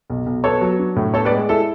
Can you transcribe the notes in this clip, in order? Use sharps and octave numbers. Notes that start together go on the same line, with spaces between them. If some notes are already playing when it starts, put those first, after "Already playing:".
B1
B1
B3 A4 C#5
F#3
D4
A2
B3 A4 C#5
B4 D5
G#3
E4 A4